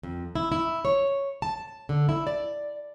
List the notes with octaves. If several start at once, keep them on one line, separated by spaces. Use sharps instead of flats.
F2
E4
E4
C#5
A5
D3
E4
D5